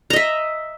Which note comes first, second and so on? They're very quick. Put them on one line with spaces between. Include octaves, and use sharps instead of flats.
A#5 D#5 E5